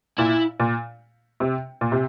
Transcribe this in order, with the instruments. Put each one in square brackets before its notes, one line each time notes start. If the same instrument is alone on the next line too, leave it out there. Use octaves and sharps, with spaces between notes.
[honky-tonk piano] A#2 [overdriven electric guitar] E4
[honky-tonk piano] A#2
C3
A#2
C3